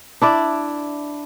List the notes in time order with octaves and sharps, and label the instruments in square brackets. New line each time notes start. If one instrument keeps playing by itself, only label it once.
[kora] D4 E4 D5